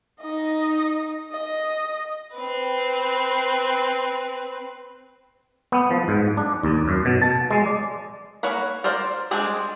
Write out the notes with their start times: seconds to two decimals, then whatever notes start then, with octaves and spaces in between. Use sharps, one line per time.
0.21 D#4 D#5
1.32 D#5
2.35 C4 B4
5.72 B3
5.91 F3
6.08 G#2
6.37 D4
6.63 D#2
6.88 F#2
7.05 B2
7.22 A5
7.51 G#3
7.66 D5
8.43 A#3 C#5 F#5 B5
8.84 A#4 C5 D5 F5
9.31 G3 G#3 C4 D4 G#5